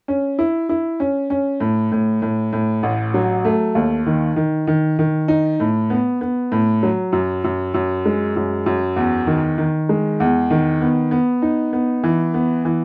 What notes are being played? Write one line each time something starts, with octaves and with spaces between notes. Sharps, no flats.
C#4
E4
E4
C#4
C#4
A2
A2
A2
A2
A1
F#3
A3
D#2
D#3
D#3
D#3
D#3
D#4
A2
B3
B3
A2
F#3
F#2
F#2
F#2
G#3
F#2
F#2
E2
D#3
D#3
G#3
E2
D#3
B3
B3
D#4
B3
E3
B3
E3